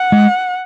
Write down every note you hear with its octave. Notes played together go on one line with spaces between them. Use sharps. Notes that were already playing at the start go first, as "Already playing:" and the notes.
Already playing: F#5
G#3